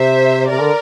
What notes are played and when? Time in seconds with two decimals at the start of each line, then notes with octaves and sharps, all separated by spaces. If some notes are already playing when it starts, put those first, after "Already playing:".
Already playing: C3 C5 E5
0.49 C3 A#4 D5
0.61 D3